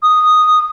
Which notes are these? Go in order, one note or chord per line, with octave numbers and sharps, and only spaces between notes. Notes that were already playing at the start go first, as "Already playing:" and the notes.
D#6